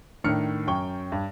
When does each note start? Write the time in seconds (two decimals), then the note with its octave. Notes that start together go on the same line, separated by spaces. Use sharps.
0.24 A2 D#3 D4 F6 C#7
0.67 F#2 G5 C#6 G7
1.12 G2